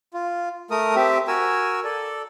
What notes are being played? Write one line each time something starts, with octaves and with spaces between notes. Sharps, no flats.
F4
A3 A#4 D#6
C4 G4 E5
F#4 A#4 G#5 E6
A4 D5